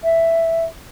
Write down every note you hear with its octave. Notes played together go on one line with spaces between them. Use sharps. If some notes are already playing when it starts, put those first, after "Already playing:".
E5